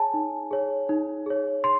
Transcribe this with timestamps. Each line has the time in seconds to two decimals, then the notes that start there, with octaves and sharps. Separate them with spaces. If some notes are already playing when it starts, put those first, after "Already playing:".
Already playing: G#4 C#5 G#5 A5
0.14 D#4
0.51 G#4 C#5
0.89 D#4
1.26 G#4 C#5
1.64 C6